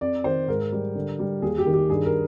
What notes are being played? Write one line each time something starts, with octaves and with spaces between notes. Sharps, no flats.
F2 D5
D#3 C5
G#2 A#4
G3
D3
G3
D#2 G#4
G4
D#3
G4
G2 G#4
A#4